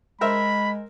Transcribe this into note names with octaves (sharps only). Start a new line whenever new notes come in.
G#3 A#4 C5 E5 B5